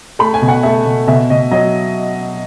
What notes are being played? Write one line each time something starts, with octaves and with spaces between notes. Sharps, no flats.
A3 B5
G#5
B2
F#5
A3 E5
B2
B2 E5
B2 D#5
F#3 D#5